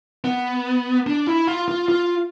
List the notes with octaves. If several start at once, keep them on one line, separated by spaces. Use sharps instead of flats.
B3
D4
E4
F4
F4
F4